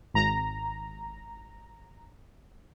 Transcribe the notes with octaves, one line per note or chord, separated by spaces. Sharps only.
G#1 A#5